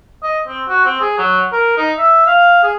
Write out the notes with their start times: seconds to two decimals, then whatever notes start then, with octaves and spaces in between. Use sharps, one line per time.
0.23 D#5
0.48 C4
0.69 F#4
0.85 C4
1.01 G#4
1.18 F#3
1.52 A#4
1.77 D#4
1.98 E5
2.27 F5
2.63 G#4